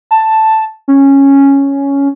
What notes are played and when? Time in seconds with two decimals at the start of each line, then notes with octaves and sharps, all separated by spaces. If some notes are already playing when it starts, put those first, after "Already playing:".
0.11 A5
0.88 C#4